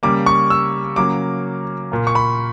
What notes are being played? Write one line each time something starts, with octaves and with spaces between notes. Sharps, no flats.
C#3 G3 A#3 D6
C#6
E6
C#3 F#3 A#3 D6
A#2 A#3
C#6
B5